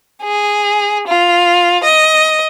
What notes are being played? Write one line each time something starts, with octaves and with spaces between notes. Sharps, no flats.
G#4
F4
D#5